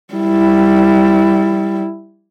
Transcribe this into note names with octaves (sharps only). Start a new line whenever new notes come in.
G3 E4